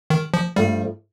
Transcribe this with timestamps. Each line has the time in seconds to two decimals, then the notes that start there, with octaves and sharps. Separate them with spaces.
0.10 D#3
0.34 F3
0.56 G2 F3 G3 A3